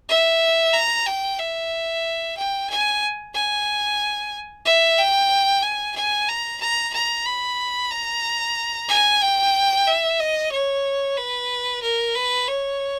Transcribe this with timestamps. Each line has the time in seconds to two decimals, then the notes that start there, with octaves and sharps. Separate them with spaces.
0.09 E5
0.74 A#5
1.07 G5
1.39 E5
2.37 G5
2.70 G#5
3.34 G#5
4.65 E5
4.98 G5
5.63 G#5
5.95 G#5
6.29 A#5
6.61 A#5
6.93 A#5
7.25 B5
7.91 A#5
8.88 G#5
9.21 G5
9.87 E5
10.20 D#5
10.52 C#5
11.17 B4
11.82 A#4
12.15 B4
12.47 C#5